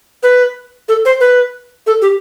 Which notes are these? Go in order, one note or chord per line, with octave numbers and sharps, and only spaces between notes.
B4
A4
C5
B4
A4
G4